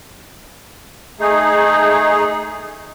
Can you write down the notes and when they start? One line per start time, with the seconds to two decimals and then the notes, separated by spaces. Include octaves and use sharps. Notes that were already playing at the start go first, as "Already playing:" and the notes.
1.19 A3 D#4 G#4